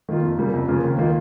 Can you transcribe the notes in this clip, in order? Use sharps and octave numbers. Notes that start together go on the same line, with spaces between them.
D#3 A#3 F4
F2
C#3 G3 A#3
F2
C#3 F3 A#3 F4
D#2
D#3 A#3 F4